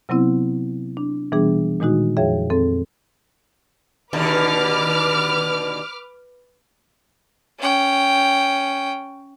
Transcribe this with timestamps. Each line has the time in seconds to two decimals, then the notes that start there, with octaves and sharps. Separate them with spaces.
0.09 C3 F#3 B3 C4 E4
0.97 D4
1.32 B2 E3 G3 B3 D4 G#4
1.80 A#2 D#3 G#3 D#4 F#4
2.17 F2 F3 G#4 C#5 E5 G5
2.50 F2 C4 A4
4.13 D#2 B2 D3 B4 D6 F6
7.59 C#4 G5